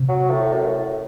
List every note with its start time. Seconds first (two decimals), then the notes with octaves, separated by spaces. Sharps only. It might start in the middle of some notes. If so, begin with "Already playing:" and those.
Already playing: C3
0.09 F#3
0.30 A2
0.53 F#2
0.68 A2